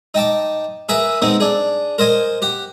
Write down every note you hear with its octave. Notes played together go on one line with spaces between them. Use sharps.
D#4 G5 A5 D6
G#4 A#4 B4 E5 G#5
G#3 B3 C4 D#4
D4 G#4
A#4 C5 D#5 G#5
G4 F#5